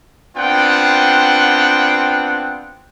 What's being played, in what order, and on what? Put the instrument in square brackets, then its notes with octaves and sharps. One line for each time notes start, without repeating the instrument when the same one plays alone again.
[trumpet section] B3 C4 D4 F4 F#5 G5